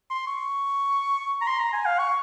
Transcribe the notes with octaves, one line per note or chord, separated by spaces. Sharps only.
C6
C#6
A#5
C6
A#5
G#5
F5
C#6